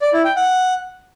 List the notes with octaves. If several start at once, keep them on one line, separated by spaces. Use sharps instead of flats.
D5
E4
G5
F#5